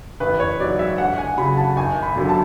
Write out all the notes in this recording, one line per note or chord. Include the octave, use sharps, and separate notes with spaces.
A1 B4
C#5
G#2 F#3 D5
E5
D2 F#5
G#5
C#3 F#3 B5
A5
G#1 G#5
B5
F#2 D3 F#3
A5